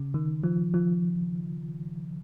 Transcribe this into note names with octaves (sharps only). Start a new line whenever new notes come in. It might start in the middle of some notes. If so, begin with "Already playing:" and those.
Already playing: C#3
D#3
F3
F3